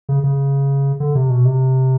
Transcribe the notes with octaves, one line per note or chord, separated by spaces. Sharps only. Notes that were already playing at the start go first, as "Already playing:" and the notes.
C#3
C#3
D3
C3
B2
C3